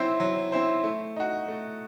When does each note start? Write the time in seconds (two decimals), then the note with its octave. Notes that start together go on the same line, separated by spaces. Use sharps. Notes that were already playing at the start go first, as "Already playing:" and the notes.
Already playing: F#3 C4 E4 C5
0.20 F#3
0.52 C4 E4 C5
0.84 A3
1.16 D#4 F#4
1.48 A3